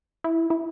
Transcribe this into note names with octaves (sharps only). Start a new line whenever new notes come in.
E4
E4